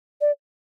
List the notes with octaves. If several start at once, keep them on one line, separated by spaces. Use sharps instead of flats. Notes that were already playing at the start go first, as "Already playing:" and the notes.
D5